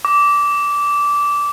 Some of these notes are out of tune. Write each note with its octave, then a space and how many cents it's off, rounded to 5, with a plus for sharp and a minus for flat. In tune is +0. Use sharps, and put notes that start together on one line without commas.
D6 -15